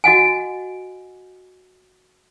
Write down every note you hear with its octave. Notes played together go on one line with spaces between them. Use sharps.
F#4 D#5 F#5 G#5